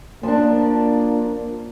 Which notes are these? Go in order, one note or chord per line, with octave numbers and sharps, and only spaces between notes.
F3 A#3 D4